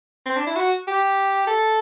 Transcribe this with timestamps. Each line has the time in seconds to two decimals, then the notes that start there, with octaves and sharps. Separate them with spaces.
0.26 C4
0.36 D4
0.47 E4
0.56 F#4
0.87 G4
1.47 A4